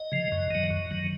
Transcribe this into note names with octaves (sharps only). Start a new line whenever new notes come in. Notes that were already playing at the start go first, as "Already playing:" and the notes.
Already playing: D#5
C#3 F3
F#2
D#3 F#3
F#2
D#3 F#3